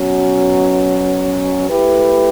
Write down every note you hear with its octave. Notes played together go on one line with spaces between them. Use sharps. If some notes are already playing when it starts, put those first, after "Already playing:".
Already playing: B2 F#3 C#4
A3 E4 G4 B4